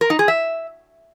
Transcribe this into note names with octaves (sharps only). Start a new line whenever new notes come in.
A#4
D#4
G#4
E5